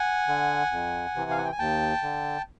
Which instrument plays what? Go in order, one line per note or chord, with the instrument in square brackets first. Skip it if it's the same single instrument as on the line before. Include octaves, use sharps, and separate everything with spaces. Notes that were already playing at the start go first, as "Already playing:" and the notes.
Already playing: [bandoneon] F#5 G#5
D3
F2
C3 E3
F5
F#5
G5
G#5
D#2 G5 A5
D3